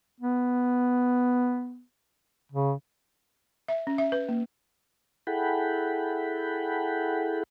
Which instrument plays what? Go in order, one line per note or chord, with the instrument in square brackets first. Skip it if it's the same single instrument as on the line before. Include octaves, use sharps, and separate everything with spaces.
[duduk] B3
C#3
[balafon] E5
C#4
E5
B4
A#3
[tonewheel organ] E4 G#4 A4 F#5 G5 B5